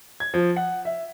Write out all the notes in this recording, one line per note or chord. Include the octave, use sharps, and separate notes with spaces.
G#6
F3
F#5
E5